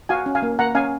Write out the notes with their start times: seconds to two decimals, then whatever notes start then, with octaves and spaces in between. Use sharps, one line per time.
0.09 F#4 F5 G#5
0.26 C#4
0.35 F5 G#5
0.42 A#3
0.59 A#3 F#5 A#5
0.75 C#4 F5 G#5